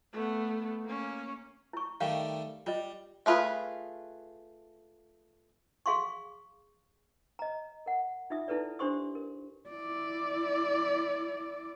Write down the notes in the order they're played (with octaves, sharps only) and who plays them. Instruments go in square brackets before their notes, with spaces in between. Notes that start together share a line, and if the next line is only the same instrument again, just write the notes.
[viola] A3 B3
A#3 C#4
[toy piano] E4 C#6
[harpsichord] D#3 G3 A3 [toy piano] F5
[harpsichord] G3 [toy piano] F4 D#5
[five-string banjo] A3 D4 F4 G#4 B4
[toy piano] G#4 F5 C6 C#6
D#5 A#5
A#4 F#5
D#4 F4 E5 D#6
D#4 E4 A4 B4 D5
D4 G4 C5 C6 C#6 D#6
A#4
[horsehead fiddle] E4 D5